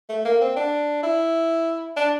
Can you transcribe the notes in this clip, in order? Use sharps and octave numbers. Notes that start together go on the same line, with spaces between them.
A3
A#3
C4
D4
E4
D4